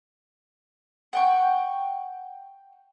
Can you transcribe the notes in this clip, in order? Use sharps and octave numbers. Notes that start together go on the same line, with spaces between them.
F#5 G5 C#6